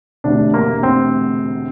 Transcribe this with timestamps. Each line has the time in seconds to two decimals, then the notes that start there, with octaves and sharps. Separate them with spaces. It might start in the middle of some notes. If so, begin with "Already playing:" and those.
0.24 E1 D2 C3 D4
0.54 A#3
0.83 C4